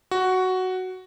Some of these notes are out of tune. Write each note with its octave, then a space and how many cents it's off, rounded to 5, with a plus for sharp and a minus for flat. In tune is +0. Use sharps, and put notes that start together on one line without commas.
F#4 +5